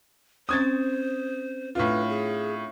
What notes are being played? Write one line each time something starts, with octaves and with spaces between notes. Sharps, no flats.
C4 C#4 C5 D#6 G#6 A6
A2 D4 F4 B4
G#4